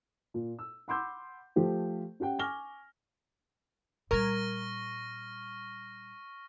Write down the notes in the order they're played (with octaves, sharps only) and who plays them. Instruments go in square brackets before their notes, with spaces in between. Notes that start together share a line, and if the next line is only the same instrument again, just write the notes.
[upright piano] A#2
E6
F#5 B5 C6 D6 E6 G6
F3 A3 G4 C5
C#4 G4 F#5 G5
G#5 C#6 D6 F6 A#6 G7
[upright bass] A#2 G3 [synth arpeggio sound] A#4 A#5 G#6 [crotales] C#6 F6 A#6